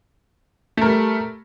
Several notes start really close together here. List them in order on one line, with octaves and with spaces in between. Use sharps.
A3 A#4 G3